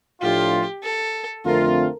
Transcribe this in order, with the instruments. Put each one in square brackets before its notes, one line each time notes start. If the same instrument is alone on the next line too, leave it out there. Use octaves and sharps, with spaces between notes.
[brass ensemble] A2 F3 A3 D4 F4 [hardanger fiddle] G4
[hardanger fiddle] A4
[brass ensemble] F2 D3 A3 C4 F4 [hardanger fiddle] A#4